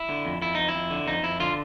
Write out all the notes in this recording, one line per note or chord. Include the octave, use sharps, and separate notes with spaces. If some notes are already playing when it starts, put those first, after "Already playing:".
Already playing: E4
D3
F2
F2 E4
F2 D#4
E4
F2
D3
F2 D#4
F2 E4
D3 F4